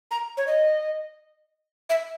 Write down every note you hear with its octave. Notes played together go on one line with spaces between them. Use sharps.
A#5
C#5
D#5
E5